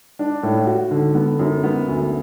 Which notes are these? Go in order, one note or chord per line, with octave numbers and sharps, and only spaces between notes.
D4
A2
F#4
D3
B3
F#2
B3
D2